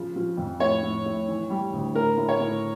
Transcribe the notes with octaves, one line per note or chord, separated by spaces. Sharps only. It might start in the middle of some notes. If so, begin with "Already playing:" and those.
Already playing: C#3 F3
F3
F2
A2 C#5
A2
A2
E3
G3
D2
A2 A#4
A2
C#5
A2